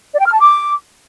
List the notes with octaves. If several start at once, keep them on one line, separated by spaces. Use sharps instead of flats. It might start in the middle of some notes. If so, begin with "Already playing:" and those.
D5
G5
F6
A5
D6